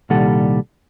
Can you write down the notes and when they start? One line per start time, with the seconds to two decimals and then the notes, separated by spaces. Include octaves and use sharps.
0.10 C2 A#2 D#3 G3 A4 F#5